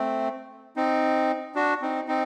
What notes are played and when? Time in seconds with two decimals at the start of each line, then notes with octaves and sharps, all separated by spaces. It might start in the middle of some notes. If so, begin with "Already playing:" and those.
Already playing: A3 C4
0.76 C4 D#4
1.55 D4 F#4
1.81 C4 D#4
2.08 C4 D#4